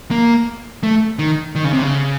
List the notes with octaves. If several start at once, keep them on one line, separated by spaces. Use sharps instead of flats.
A#3
A3
D#3
D#3
C#3
C3
C#3